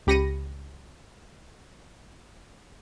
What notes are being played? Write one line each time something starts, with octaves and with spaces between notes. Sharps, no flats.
C#2 G4 B5 A#6 C#7 D#7